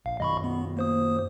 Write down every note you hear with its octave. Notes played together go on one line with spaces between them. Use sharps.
A#1 F5
F#2 D#3 F#3 D#5 B5 C#6
B3
A#3 C5 D#6